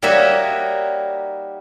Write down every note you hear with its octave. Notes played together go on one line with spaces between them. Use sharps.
G3 A#3 D#4 F#4 C#5 E5